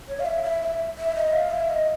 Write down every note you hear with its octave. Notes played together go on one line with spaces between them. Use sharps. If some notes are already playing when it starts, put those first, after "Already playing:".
C#5
F5
E5
E5
E5
E5
D#5
F5
E5
D#5